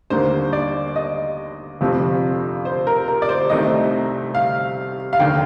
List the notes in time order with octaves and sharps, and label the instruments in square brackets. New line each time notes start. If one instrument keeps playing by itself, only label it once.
[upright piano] D#2 D3 G3 A#3 C5
D5
D#5
G1 F2 C3 F3 C4
C5
A#4
A#4
D5
C5
C2 C3 D#3 A3 C4 D#5
F5
F5
F1 D#2 D3 G5